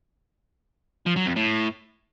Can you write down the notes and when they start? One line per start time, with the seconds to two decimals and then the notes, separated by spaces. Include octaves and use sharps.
1.06 F3
1.16 F#3
1.26 F2
1.36 A2